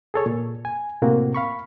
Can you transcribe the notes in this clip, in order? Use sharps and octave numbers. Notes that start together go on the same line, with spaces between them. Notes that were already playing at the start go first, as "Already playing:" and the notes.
G#4 A4 C#5
A#2
G#5
A2 C3 A#3 C4 F#4
F5 B5 C#6